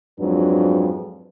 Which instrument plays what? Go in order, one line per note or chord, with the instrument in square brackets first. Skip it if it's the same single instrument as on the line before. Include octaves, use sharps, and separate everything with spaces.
[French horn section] F2 G#2 F#3 D4 B4